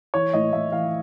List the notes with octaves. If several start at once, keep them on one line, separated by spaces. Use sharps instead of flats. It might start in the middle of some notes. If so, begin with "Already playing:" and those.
E3 C#5
A2 D#5
A2 E5
E3 F5